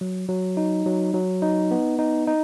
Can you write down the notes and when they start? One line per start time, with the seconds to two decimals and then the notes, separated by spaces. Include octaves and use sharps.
0.01 F#3
0.29 F#3
0.57 D#4
0.86 F#3
1.14 F#3
1.42 D#4
1.71 B3
1.99 D#4
2.27 D#4